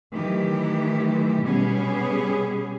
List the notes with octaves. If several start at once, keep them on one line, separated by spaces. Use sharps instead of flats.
D#3 E3 F#3 A3 G4
B2 G3 B3 C#4 G4 G#4